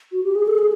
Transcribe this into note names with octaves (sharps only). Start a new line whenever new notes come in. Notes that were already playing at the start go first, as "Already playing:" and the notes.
F#4
G4
G#4
A4
G#4